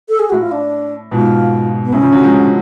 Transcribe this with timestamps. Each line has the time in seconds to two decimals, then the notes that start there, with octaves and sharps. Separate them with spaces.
0.09 A4
0.19 G#4
0.30 A2 F#4
0.41 F4
0.51 D4
1.11 G#2 B2 F4
1.85 B3
1.92 A2 C#3 C#4
2.03 C#3 F3
2.12 D3 F#3
2.23 F3 G#3